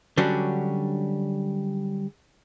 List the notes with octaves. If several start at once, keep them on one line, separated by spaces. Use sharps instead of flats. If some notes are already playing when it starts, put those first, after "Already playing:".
D3 F#3 G3 C#4 D4 F#4